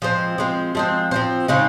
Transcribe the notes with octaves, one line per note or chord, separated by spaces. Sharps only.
F3 G#3 C4
F3 G#3 C4
F3 G#3 C4
F3 G#3 C4
C#3 G#3 C4 D#4